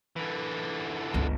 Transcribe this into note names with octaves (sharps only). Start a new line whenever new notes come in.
D3 E3
G1 C#2